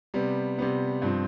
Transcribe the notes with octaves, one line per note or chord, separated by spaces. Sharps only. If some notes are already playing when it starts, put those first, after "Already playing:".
C3 G3 B3
C3 G3 B3
G2 F3 C4